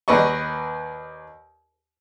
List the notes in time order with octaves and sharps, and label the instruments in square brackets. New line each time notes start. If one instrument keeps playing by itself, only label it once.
[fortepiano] D#2 B4 D5 D#5 C#6